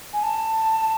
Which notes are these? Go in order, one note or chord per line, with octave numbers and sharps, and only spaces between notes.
G#5
A5